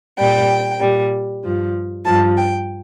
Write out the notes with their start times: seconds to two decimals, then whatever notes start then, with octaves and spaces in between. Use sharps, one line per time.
0.19 A#2 G3 G5
0.81 A#2 G3
1.44 G2 F3
2.05 G2 F3 A5
2.37 G5